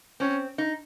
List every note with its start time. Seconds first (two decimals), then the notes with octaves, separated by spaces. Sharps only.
0.20 C4 C#4
0.58 D#4